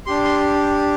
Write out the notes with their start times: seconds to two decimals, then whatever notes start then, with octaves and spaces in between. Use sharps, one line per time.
0.06 D4 G4 C6
0.24 C6